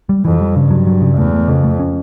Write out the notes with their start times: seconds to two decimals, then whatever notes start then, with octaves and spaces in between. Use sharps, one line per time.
0.09 G3
0.25 F2 E3
0.40 G3
0.55 G2 C#3
0.71 F#3
0.87 F#3
1.01 C#3
1.17 E2 A3
1.33 A3
1.48 F2 C#3
1.64 A3
1.80 C#4